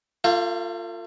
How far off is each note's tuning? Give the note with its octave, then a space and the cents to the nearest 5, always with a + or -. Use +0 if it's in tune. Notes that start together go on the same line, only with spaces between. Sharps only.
A3 +45 F4 +0